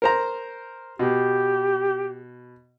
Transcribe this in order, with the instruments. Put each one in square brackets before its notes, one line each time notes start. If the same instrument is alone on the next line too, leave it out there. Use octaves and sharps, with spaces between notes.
[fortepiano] A#4 C5 A#5
[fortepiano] B2 [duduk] G4